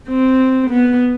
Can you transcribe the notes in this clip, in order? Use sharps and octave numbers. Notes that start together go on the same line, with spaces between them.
C4
B3